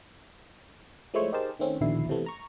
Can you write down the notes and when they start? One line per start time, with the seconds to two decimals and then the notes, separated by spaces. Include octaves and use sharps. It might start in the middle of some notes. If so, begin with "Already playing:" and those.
1.14 F3 G#3 A3 E4 C5 C#5
1.32 D#4 G4 G#4 A#4 C5 A5
1.59 D#3 A3 C4 C#4
1.81 A#1 D#2 B2 D3 E4 C7
2.09 C3 E3 A3 B3
2.26 A#5 C#6